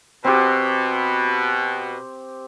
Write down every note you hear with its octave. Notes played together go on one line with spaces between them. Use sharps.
B2 C4 G4